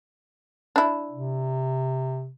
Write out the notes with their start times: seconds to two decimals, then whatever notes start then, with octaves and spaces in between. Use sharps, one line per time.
0.76 D4 E4
1.11 C3